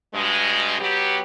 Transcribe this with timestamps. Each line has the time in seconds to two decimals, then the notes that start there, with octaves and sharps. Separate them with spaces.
0.13 G2 B2 G#3
0.79 F#3 B3 G4